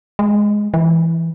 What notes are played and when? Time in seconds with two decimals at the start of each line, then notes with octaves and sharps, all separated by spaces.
0.19 G#3
0.74 E3